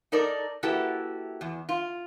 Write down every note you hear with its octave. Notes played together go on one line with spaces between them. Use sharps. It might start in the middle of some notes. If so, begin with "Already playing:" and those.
D#4 A4 A#4 D5
A#3 E4 F#4 G4 A4 B4
E2
F4